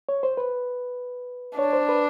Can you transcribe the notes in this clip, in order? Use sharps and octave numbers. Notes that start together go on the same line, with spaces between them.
C#5
C5
B4
D4 C#5
C5
B4